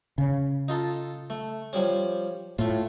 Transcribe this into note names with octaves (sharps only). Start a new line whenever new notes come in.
C#3
D#4 F4 A4
A3
F3 G3 C#4
A2 A3 F4